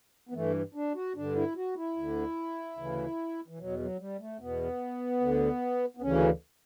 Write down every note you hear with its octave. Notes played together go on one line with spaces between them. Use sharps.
B3
G2 E3 A3
D4
F#4
G2 D3 D4
E4
F#4
E4
D2 D3
D2 C#3 E3
E3
E2 B2 F#3
F#3
G3
A3
E2 B2 B3
D2 D3
B3
D2 C#3 E3 C#4